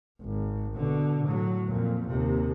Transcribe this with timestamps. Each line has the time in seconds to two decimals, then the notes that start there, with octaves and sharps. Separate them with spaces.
0.21 G#1
0.75 B2 D3
1.24 A2 F#3
1.71 F2 A#2
2.07 D#2 C3